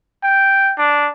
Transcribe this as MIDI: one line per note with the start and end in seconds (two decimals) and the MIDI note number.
0.23 0.72 79
0.78 1.09 62